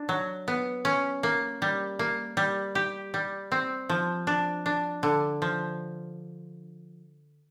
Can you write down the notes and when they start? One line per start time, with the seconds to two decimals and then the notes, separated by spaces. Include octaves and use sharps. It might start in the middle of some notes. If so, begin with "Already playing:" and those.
Already playing: D4
0.09 F#3
0.48 B3
0.85 C#4
1.23 A#3
1.62 G3
1.99 A#3
2.37 G3
2.75 G4
3.14 G3
3.52 C4
3.89 F3
4.27 D4
4.66 D4
5.03 D3
5.42 F3